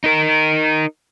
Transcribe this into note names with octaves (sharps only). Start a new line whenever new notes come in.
D#4 A#4